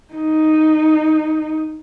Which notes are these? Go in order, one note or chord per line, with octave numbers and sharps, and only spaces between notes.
D#4